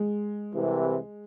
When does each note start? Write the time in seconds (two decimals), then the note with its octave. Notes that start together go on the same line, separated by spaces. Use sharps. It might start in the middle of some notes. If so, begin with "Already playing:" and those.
Already playing: G#3
0.54 C2 C3 E3